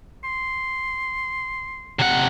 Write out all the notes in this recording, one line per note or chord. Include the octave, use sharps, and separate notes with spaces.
C6
C3 F#5